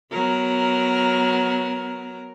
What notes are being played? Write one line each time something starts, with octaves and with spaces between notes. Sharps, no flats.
F#3 B3 A#4